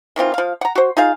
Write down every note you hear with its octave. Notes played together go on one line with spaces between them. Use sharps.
D#3 E3 C4 F4
F3 F5
F#5 A#5
F#4 C5
D#4 F4 G#4 F5